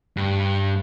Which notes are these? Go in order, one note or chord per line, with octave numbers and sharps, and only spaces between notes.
G2